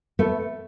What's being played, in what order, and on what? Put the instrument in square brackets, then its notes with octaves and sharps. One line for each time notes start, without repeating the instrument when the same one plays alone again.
[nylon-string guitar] A3 B3